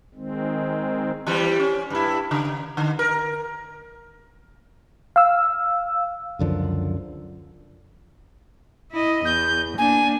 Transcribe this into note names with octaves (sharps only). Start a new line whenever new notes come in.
D#3 G#3 C4
E3 G3 C4
C#4
G2 E4
C#3
D3
A#4
F5 E6
C#2 F#2 D3 F3
E4 D#5
E2 G6
A#3 D4 G#5